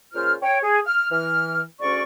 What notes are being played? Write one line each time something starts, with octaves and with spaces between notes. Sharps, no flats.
A#2 C#3 F4 C5 F6
C#5 G5
G#4
F6
E3 F6
D2 G#2 C#4 F#4 D5 C#6